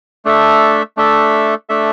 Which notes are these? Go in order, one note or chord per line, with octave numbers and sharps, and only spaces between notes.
A3 D4 A4 E5
A3 D4 A4 E5
A3 D4 A4 E5